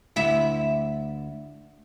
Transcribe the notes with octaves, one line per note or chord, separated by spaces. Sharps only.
D2 E4 E5